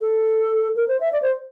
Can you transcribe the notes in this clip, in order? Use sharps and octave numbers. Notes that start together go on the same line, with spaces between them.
A4
A#4
C5
E5
D5
C5